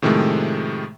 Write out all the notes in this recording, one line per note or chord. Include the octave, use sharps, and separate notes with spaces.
A2 C3 D#3 F3 G#3 A3